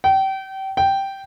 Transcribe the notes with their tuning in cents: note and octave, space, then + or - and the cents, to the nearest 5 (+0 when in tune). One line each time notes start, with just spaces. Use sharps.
G5 -30
G5 -5